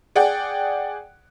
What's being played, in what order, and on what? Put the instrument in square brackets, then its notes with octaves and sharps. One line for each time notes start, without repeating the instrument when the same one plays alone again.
[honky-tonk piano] G#4 D5 F#5 G5